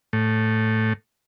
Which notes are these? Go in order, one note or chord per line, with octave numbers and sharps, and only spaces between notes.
A2